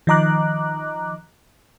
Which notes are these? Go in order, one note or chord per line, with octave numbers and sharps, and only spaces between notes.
D#3 F3 D#5 A#5 D6 F#6